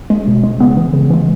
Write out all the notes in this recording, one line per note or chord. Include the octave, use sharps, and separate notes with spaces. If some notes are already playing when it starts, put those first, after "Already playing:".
G#3
B2
G#3
C#3 B3
E3 G#3
C#3
E3 G#3